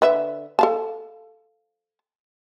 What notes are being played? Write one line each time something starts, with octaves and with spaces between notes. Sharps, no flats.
D3 B4 E5
A4 F5 A5